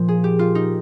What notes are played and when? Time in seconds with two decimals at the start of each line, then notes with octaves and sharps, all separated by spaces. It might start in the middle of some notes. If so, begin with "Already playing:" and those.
Already playing: A#2 F3
0.08 G#4
0.24 G4
0.39 F4
0.55 D#4